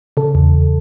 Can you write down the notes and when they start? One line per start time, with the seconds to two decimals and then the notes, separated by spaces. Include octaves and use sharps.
0.17 C#3 A4
0.35 E2
0.54 E2